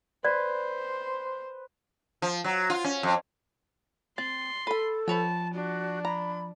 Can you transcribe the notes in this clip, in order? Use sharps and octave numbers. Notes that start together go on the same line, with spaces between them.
B4 C5 D5
F3
F#3
F4
C#4
F2
C4 C6 A6
A4 B4 B5
F3 B4 C#5 G5 A5
D4 F#4
A#5 B5